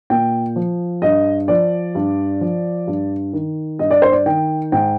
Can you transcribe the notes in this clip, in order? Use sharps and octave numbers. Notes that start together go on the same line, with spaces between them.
A#2 G5
F3
G2 D#5
F3 D5
G2
F3
G2
D#3
G2 D#5
D5
C5
D5
D#3 G5
G#2 G5